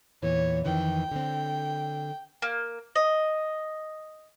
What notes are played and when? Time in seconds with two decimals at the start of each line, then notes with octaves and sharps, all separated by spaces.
0.23 E2 A#2 E3 C#5
0.66 F2 D#3 E3 G5
1.12 D3 C4
2.42 A#3
2.95 D#5